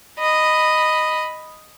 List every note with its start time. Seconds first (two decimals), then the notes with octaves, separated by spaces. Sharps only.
0.19 D#5 B5